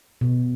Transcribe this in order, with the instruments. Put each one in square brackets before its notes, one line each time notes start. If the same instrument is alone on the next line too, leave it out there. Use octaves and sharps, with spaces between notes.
[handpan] B2